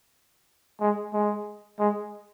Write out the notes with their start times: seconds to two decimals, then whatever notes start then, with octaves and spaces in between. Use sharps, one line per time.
0.80 G#3
1.14 G#3
1.79 G#3